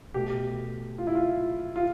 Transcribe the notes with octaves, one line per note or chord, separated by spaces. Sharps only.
B2 A3 G4
F4
E4
F4
F4